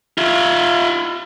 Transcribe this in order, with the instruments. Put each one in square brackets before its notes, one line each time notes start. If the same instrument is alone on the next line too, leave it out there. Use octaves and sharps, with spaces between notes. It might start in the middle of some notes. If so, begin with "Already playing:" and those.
[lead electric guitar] F4 E5